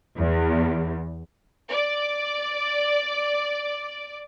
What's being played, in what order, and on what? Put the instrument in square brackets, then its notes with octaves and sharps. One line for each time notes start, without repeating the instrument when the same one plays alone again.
[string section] E2
D5 D6